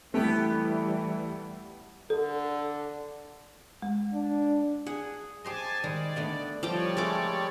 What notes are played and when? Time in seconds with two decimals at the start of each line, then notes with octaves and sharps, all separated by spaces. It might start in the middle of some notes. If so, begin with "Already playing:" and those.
0.14 E3 G3 A3 B3 E4 G4
2.10 D3 A4
3.82 G#3
4.14 D4
4.86 G#4 F#5
5.44 G4 C5 D#5 G#5 A5
5.84 D#3 G3 G#3 D5
6.16 D3 A3 B3
6.63 F3 G3 G4 C#5 D5 G5
6.97 G#3 A3 A#4 D6